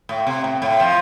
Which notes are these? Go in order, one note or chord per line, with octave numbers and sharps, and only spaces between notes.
A2
C3
A2
A2
F3